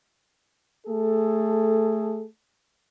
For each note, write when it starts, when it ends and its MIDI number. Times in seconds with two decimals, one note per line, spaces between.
0.87 2.27 57
0.87 2.27 68
0.87 2.27 69